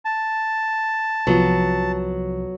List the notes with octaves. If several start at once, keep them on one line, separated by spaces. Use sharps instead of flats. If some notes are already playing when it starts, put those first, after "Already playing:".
A5
C2 C3 F3 F#3 B3 F4